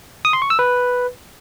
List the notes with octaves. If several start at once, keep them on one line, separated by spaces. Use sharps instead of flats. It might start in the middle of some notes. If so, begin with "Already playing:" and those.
D#6
C6
C#6
E6
B4